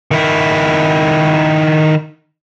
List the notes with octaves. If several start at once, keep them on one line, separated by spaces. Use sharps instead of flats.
D#3 E4